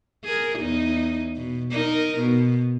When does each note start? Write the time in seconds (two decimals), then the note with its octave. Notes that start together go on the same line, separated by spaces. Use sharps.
0.24 G#4 A#4
0.59 E2 D#4
1.36 B2
1.71 D#4 A#4
2.18 B2